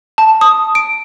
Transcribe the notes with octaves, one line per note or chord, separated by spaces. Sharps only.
A5
D#6
D7